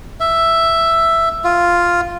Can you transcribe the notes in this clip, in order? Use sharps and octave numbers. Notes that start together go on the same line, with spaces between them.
E5
F4